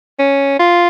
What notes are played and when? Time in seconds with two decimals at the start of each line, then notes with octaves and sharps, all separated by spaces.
0.19 C#4
0.59 F4